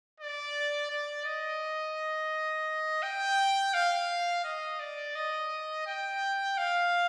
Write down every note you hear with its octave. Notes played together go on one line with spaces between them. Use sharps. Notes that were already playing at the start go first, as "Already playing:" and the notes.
D5
D5
D#5
G5
F5
D#5
D5
D#5
G5
F5